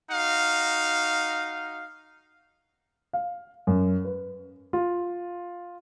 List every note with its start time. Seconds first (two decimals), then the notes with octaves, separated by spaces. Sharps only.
0.11 D#4 F#4 F5
3.13 F5
3.67 F#2
4.04 B4
4.73 F4